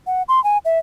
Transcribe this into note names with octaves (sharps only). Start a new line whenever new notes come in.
F#5
C6
G#5
E5